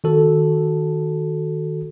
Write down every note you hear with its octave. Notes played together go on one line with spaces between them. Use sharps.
D#3 F#4 A4